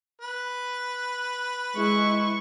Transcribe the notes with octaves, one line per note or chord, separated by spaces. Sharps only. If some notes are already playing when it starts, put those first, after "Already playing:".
B4
G#3 E4 C#6